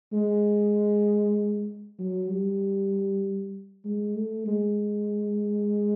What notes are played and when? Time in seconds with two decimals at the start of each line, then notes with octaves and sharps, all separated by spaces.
0.13 G#3
1.99 F#3
2.29 G3
3.85 G#3
4.15 A3
4.46 G#3